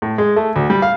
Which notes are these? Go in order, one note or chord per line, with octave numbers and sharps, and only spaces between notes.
A2
G#3
A3
D2
G3
F5